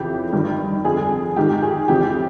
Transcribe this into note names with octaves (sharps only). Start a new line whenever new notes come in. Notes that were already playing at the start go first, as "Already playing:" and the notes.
Already playing: F2 C#3 E3 G4
G2 D#3
F2 D3 G#4
G#2 D#3 G4
G#4
F2 C#3 E3 G4